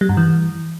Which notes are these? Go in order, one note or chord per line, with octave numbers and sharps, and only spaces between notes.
G3
G2
E3